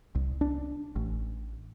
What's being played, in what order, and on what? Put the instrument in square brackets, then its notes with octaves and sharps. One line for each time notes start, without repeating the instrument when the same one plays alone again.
[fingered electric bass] C2
D4
A1